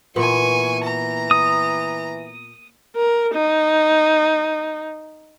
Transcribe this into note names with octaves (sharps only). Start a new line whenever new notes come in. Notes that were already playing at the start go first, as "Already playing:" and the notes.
A#2 E3 B3 G#5 C#6
A#5
D#6
A#4
D#4